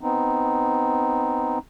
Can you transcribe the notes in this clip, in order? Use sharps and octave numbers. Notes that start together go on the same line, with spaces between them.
B3 C4 D#4